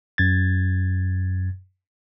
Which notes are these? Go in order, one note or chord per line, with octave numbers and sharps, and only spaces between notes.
F#2 G#6 A6